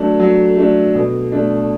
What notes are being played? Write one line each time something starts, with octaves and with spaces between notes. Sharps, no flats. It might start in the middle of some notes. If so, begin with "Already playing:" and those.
Already playing: F#3 A3 D4
F#3
A3 D4
B2
A3 D4